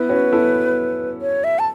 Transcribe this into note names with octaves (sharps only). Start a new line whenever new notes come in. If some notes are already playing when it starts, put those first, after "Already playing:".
Already playing: B3 E4 B4
C#4 F#4
E4 A4
C#5
E5
A5